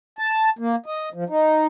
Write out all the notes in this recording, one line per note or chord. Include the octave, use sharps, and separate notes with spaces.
A5
A#3
D#5
F3
D#4